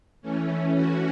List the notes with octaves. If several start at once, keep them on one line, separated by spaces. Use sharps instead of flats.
E3 A3 C#4
F#4